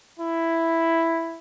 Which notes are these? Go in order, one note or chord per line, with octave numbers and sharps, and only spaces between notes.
E4